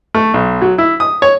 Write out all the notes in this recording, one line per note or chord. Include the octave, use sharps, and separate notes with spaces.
A3
B1
F#3
E4
D#6
C#5